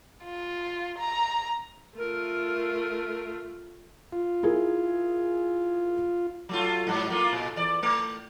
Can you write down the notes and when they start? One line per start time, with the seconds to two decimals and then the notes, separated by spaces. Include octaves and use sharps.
0.24 F4
0.98 A#5
1.98 A3 F4 A#4
4.13 F4
4.43 E4 G#4 A#4
6.49 F#3 A3 F4
6.87 G#2 F#3
7.09 A3 A#3 F4
7.33 A#2
7.56 E2 D5
7.83 A3